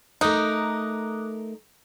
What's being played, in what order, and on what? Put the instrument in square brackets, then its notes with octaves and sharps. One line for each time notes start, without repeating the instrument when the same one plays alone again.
[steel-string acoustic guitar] A3 A#4 [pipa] D#4 [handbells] D6 D#6 F#6